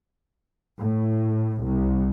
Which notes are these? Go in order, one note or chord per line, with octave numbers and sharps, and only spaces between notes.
A2
C2